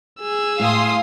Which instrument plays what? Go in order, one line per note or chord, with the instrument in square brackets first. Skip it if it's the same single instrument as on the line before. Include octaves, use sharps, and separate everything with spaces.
[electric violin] G#4 E6
[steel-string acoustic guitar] A2 [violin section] F5 C6 D#6